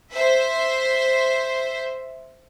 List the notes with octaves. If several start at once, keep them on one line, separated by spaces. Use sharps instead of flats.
C5 E5